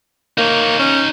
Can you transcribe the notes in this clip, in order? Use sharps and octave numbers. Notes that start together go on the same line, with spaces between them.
A#3 D#4 C#5
C#4